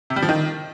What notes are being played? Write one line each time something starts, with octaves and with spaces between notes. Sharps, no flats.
C3
G3
F3
D#3